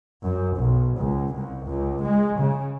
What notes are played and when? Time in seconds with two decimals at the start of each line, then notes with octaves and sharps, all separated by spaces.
0.22 F#2
0.56 B1
0.97 C#2
1.33 C2
1.65 C#2
2.04 G#3
2.39 C#3